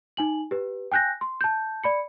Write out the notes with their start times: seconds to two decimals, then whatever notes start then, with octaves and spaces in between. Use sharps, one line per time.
0.17 D#4 G#5 F#7
0.51 G4 B4
0.92 G5 G#5 F#6 G6 A#6
1.21 C6
1.41 A5 G6
1.83 D5 B5 C#7